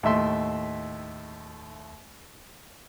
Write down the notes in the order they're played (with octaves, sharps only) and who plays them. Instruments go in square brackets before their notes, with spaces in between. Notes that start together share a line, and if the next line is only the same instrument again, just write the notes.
[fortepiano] D#2 A2 E5 C6